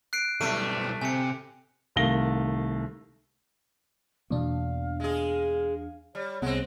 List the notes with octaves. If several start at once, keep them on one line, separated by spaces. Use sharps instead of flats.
F#6 C7 D7
B1 G3 A3 D#7
C3 G#5 C#7
C2 D#3 A3 F5 A#6 G7
E2 B2 A#3 D4 F5
G#3 G#4
G3 C#5
C2 G#3 B3 C4 F#5